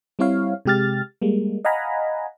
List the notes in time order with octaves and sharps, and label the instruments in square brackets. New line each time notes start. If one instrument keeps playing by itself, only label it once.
[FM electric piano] G3 C4 E4 C#5 F5
C3 G#3 G4 F6 A6
G3 G#3 A#3
D#5 F5 F#5 G#5 A#5 B5